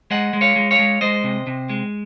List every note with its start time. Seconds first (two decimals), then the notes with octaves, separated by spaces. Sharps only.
0.11 G#3 D#5 F#5
0.33 G#3
0.41 C#5 F5
0.56 G#3
0.71 C#5 F5
0.79 G#3
1.01 G#3 C5 D#5
1.24 C3
1.47 C3
1.70 G#3